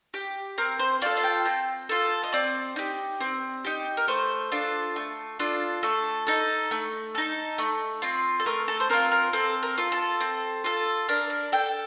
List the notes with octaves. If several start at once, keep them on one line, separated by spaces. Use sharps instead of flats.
G4
C4 A#4
C5
F4 A4 D5
F5
G5
C4
F4 A4
D#5
C4 D5
D#4 G4
C4
D#4 G4
A#4
A3 C5
D4 F4 A4
A3
D4 F4 A4
A3 A4
D#4 A4
A3
D#4 A4
A3
C4 F4
A4
A3 A#4
A4
C5
C4 F4 A#4
A#4
C4 A4
A#4
F4 A4
A4
C4
F4 A4
D4 A#4
A#4
A4 G5